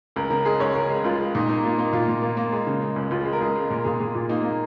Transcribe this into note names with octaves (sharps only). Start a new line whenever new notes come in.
C#2 A#4
C#3 A#4
G#3 G#4
C#2 C#5
C#2 A#4
G#3
C#2 F4
G#3
A#2 D#4
A#3 D#4
A#3 F4
A#3 D#4
A#2 F4
A#2
A#3
A#3
G#3
C#3
G#3
C#2
C#2 F4
G#3
A#4
C#2 G#4
G#3
A#2 A#4
A#2 G#4
A#2 G#4
A#2 F4
A#3 D#4
A#3